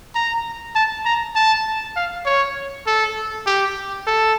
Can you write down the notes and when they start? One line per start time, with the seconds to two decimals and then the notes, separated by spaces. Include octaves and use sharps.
0.15 A#5
0.75 A5
1.05 A#5
1.36 A5
1.96 F5
2.26 C#5
2.87 A4
3.46 G4
4.07 A4